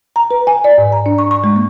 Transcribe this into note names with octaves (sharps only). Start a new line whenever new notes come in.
A#5
B4
G#5
D5
G#2
A#5
D4
C#6
C#6
G#3
A#3